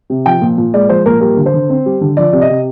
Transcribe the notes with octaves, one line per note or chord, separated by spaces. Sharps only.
C3
F3 G5
A#2
A#2
G#3 D5
F3 C5
A#2 A#4
G3 A#4
D3
C5
D3
C4
G3
D3
F3 D5
C3 D5
D#5
C3